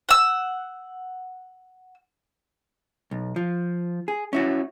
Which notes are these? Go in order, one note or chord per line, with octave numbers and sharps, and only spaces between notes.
F#5 E6
B1
F3
G#4
C#4 E4 F#4